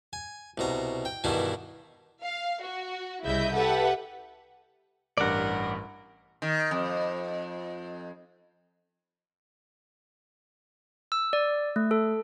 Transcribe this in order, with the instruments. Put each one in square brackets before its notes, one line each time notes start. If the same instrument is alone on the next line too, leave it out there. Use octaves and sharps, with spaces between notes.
[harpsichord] G#5
C2 B2 A#5
G5
G2 B2 D#3 E3 D4 E4
[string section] F5
F#4
C2 C#3 E4 D#5 E5 G6
G4 A4 B4 E5 F#5
[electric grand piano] A1 G2 [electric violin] A#4 [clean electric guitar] D5 F#5
[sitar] D#3
F2
[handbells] E6
D5
A3
A4